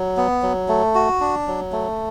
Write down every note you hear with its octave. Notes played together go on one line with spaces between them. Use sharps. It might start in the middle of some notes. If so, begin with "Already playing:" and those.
Already playing: F#3
B3
F#3
A3
F#4
D4
F#3
A3